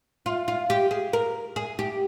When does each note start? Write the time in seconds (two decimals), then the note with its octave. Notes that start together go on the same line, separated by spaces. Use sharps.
0.26 F4
0.48 F4
0.70 G4
0.91 G#4
1.13 A#4
1.56 G#4
1.79 G4